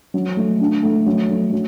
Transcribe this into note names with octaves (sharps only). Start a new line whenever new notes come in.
F#3
A3
D4
A3
F#3
A3
F#3